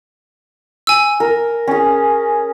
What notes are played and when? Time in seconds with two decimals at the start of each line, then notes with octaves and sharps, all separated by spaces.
0.87 G#5 E6
1.20 A#4
1.67 C#4 G#4